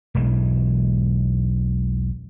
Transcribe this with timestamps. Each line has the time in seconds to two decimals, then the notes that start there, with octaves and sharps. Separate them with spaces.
0.15 E1 B1 E3 G#3